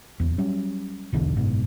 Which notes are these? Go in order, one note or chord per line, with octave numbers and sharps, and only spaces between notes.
D1 E2
F#3 G3 C#4
D#1 B1 E2 D3
F#1 G#2 B2